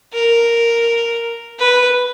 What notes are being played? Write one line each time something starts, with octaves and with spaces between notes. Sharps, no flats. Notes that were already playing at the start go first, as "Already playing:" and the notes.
A#4
B4